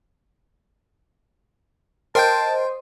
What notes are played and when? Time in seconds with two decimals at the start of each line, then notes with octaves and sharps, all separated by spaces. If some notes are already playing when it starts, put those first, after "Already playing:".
2.15 A#4 C5 D#5 G5 A5 C6 G6